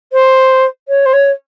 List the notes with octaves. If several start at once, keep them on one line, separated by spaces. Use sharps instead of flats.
C5
C#5
C5
C#5